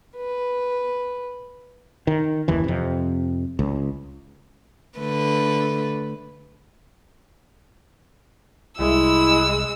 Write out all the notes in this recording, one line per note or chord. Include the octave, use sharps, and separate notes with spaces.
B4
D#3
F#1 D#2 E3
F2 C3
C#2
D3 A3 B4
C2 G#3 E4 E6